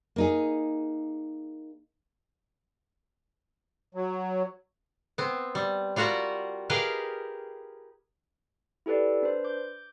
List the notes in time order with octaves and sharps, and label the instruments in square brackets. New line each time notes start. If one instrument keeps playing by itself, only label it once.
[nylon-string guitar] A#3 D#4 G#4
[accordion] F#3
[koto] B3 C4
G3
G3 F4 F#4 A#4 F#5
G4 G#4 A#4 B4 D#5 F5
[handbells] E4 G4 A4 B4 D5
D4 B4 C5
D6 G6